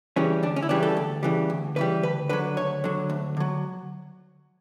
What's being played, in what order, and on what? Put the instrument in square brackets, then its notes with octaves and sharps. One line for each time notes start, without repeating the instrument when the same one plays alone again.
[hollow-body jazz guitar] C#3 E3 G3 C#4
D2 D4
C#4
E4
C#3 E3 G3 D4
A4
D2
C#3 E3 G3
D2
C#3 E3 G3 B4
D2 B4
D3 F#3 B4
D2 C#5
D3 F#3
D2
D3 F#3